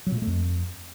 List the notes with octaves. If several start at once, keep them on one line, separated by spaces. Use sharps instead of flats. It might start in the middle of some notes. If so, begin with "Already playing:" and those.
F#3
A#2
G#3
A3
F2